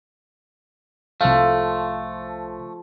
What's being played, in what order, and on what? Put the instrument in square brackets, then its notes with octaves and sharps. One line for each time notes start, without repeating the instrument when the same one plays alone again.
[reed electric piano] C2 F5 [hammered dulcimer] F3 A4 [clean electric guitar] A3